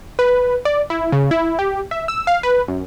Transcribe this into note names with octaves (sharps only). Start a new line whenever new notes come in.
B4
D5
E4
C#3
E4
G4
E5
E6
F5
B4
F#2